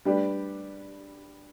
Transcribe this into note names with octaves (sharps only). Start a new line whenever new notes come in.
G3 D4 G4 B4 D5